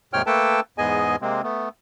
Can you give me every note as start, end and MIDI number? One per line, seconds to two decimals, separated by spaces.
0.13 0.22 39
0.13 0.22 44
0.13 0.22 48
0.13 0.22 73
0.13 0.22 79
0.13 0.22 89
0.26 0.60 57
0.26 0.60 58
0.26 0.60 69
0.26 0.60 71
0.26 0.60 79
0.26 0.60 81
0.78 1.16 40
0.78 1.16 44
0.78 1.16 59
0.78 1.16 68
0.78 1.16 75
0.78 1.16 80
1.21 1.42 48
1.21 1.42 56
1.21 1.42 58
1.21 1.42 60
1.43 1.69 57
1.43 1.69 59